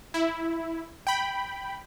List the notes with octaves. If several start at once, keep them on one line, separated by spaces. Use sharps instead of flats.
E4
G5 B5